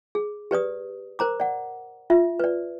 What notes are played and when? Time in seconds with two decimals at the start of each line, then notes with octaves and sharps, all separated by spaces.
0.15 G#4
0.51 G4 B4 D5 D#6
1.19 A#4 C5 A#5 D6
1.40 D5 F#5
2.10 F4 E5
2.40 B4 D5